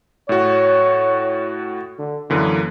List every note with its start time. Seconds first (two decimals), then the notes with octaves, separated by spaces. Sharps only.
0.29 A2 F#4 C#5
1.99 D3
2.30 F#2 D3 E3 A#3